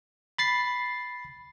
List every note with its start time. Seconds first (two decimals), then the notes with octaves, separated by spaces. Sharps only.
0.38 B5 A6 C7